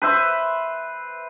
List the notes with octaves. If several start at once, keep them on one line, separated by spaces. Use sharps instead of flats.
B4 C5 E5